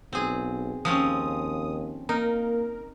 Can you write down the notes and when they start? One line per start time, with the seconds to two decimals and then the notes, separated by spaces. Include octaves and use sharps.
0.13 B1 C4 G#4
0.85 D#2 F3 C4 C#4 D#6
2.09 A#3 D#4 A#4